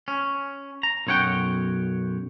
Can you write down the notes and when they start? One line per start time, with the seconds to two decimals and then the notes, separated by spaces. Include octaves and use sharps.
0.08 C#4
0.83 A#5
1.07 B1 F#2 C#5 F#5 G5